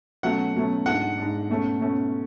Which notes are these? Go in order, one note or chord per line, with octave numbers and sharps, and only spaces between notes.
B2 F#3 A3 C#4 F#5
B2 F#3 A3 C#4
G#2 G#3 D4 F#5
G#2 G#3 D4
B2 A3 C#4
B2 A3 C#4